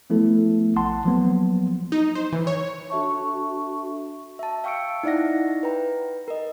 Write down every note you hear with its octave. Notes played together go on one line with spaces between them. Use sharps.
F3 A3 B3 E4 A4
A#1 F#5 A5 C6
F3 F#3 A#3 B3
D#4
C5
E3
C#5
D4 F#4 A4 E5 A5 C#6
E5 A5
F5 G5 C#6 E6 C#7 D7
D#4 E4 D5 E5 F#5 A#6
B4 G5 A#5
A#4 D#5